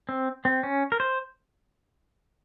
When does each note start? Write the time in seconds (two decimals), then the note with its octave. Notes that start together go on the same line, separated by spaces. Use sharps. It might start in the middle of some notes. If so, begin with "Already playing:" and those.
0.09 C4
0.45 C4
0.63 C#4
0.92 A#4
1.00 C5